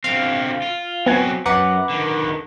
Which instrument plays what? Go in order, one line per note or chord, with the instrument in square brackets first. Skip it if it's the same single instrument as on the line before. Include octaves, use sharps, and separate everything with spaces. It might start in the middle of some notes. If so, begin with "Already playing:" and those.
[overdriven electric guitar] D3 C4 [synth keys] F5
[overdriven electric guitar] F4
[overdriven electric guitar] F#3 C4 [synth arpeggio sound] B3 G#5
[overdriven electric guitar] F#2 [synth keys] B4 F#5 [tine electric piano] A#5 D6
[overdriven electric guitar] D3 D#3